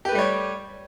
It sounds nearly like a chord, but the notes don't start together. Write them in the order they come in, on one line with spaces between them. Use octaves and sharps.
G4 B4 A3 G3 C#5